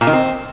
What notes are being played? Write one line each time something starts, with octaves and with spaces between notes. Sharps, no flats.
A#2
D#3
C4